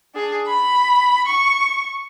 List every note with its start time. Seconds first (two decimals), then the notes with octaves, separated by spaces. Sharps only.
0.15 D4 G#4
0.47 B5
1.28 C#6